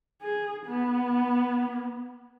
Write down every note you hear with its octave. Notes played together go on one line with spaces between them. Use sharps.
G#4
B3